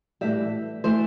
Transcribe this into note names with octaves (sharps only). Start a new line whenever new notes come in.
A2 E3 G3 E5
E3 A3 C5